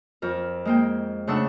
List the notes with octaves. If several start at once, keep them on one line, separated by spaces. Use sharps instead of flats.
F2 A#4
G#3 A#3 G5
C#3 A3 D4 F#5 E6